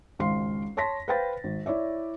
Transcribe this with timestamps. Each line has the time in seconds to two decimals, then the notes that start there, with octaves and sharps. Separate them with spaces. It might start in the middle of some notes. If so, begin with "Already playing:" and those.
0.19 G#1 C#2 F5 C6 C7
0.77 C#5 A5 C6 A#6 B6
1.08 B4 C5 F5 G5 B5 A6
1.44 G#1
1.66 E4 C#5 D5 E5